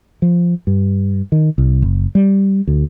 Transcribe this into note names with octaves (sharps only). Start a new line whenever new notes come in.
F3
G2
D#3
C2
F#1
G3
D2